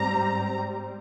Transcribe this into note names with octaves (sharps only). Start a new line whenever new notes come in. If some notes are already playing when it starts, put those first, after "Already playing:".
Already playing: G#2 G3 C4 A#5